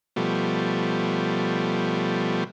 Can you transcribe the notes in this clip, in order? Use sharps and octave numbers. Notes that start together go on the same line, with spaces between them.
B2 F3 G3 A3